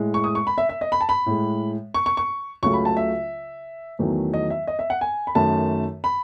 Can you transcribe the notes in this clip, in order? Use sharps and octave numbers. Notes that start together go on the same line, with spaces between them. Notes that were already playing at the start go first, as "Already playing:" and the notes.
Already playing: A2 G#3
C#6
D#6
C#6
B5
E5
E5
D#5
B5
A5
B5
A2 G#3
C#6
C#6
C#6
C#2 C#3 F#3 A3 C#6
B5
A5
E5
E2 D#3 F#3 A3
D#5
E5
D#5
E5
F#5
G#5
B5
F#2 D#3 A3 A5
B5